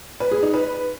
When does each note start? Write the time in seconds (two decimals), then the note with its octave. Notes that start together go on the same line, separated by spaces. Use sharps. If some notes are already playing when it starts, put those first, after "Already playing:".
0.20 B4
0.31 G#4
0.42 D#4
0.54 B4